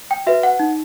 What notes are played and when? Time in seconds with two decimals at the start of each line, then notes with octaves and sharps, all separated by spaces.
0.11 G5
0.27 F#4 B4 E5
0.43 F#5
0.59 D#4